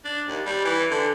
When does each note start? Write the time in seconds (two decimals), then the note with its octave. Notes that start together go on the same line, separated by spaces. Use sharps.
0.05 D4
0.28 D#2
0.46 G3
0.65 E3
0.91 D3